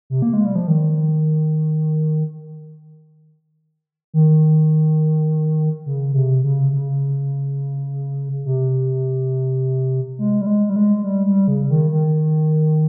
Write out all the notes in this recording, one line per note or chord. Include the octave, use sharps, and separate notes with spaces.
C3
A#3
G#3
G3
F3
D#3
D#3
C#3
C3
C#3
C#3
C3
G#3
G3
G#3
G3
G#3
G3
G3
C#3
D#3
D#3